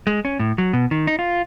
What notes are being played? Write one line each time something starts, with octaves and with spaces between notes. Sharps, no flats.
G#3
C#4
A2
F#3
B2
D#3
D#4
F4